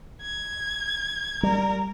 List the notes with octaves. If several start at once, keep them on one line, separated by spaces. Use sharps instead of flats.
G#6
G3 A#4